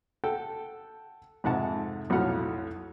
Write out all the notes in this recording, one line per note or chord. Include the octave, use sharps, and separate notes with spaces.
A4 F#5 G5
F2 G#2 C3 F#5 A5
B1 F2 A2 F#3 F#5 F6